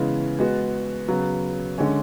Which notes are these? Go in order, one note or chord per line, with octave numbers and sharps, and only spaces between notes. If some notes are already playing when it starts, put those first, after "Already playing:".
Already playing: C#3 E3 G#3 B3
G#3 B3 F#4
C#3 F#3 B3
D3 G#3 C#4